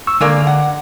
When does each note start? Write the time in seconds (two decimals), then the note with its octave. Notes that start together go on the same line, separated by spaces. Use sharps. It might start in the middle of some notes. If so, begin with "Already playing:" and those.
0.07 C#6 E6
0.21 D3 G#3 A#3 D5
0.47 F#5